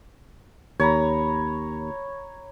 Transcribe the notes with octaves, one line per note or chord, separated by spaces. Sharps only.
D#2 C#5 A#5 B5